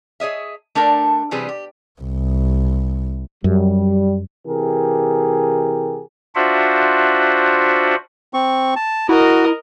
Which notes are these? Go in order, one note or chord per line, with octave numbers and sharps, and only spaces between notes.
G#4 C#5 D#5 E5
A3 D4 A4 A#4 G5
C3 E3 G3 C4 G#4 B4
G4
C2
F#2 G3
C3 E3 G4 G#4 A#4
D4 F4 F#4 C5 E5 F#5
C4 C#6
A5
E4 F#4 A#4 D#5